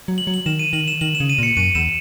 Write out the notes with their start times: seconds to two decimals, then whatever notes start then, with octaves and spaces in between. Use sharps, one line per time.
0.08 F#3
0.18 F#7
0.27 F#3
0.34 F#7
0.46 D#3 E7
0.59 D#7
0.73 D#3 F#7
0.88 E7
1.01 D#3 F#7
1.15 E7
1.20 C#3
1.29 D#7
1.38 A#2 C#7
1.57 F#2 D#7
1.75 E2 E7